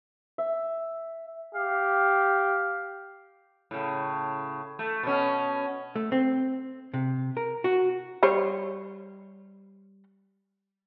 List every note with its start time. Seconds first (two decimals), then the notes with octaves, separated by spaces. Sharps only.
0.38 E5
1.55 G4 F5
3.71 A2 C#3
4.79 A3
5.03 B2 C#4
5.96 A3
6.12 C4
6.94 C3
7.37 A#4
7.64 F#4
8.23 G3 C5 C#5